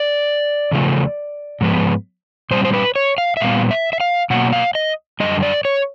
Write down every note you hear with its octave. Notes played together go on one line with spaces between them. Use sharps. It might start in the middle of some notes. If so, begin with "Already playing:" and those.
Already playing: D5
E2 C#3 F3 A3
G#2 F3 G#3 B3
A#2 G3 C4 C5
C5
B4
C#5
F5
E5
A#2 G3 B3 F5
E5
E5
F5
B2 F#3 A#3 F#5
F5
D#5
F#2 D3 G3 D#5
D5
C#5